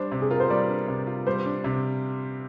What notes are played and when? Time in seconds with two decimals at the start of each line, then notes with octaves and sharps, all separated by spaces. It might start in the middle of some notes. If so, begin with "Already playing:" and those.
Already playing: G3 D4 C5
0.12 C3
0.21 G#4
0.30 F4 A#4
0.40 C5
0.50 G3 D5
0.68 D4
0.88 C3
1.07 F4
1.26 G3 C5
1.46 D4
1.64 C3